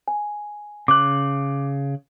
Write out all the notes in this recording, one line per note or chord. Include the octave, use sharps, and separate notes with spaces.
G#5
C#3 D6 F#6